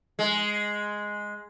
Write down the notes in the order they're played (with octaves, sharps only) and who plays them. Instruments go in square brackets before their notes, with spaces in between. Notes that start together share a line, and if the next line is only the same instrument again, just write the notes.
[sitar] G#3